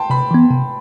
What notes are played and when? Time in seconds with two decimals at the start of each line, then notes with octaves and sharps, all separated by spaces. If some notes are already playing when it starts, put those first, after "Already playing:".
Already playing: G5 A5 C6
0.10 C3 B5
0.31 E3 B3
0.51 C3